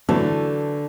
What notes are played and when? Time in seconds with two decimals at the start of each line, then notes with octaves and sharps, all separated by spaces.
0.09 D3 E3 F#3 A3